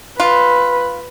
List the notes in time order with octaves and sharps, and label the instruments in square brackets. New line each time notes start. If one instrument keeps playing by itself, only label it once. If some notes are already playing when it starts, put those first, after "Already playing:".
[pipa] F4 [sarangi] B4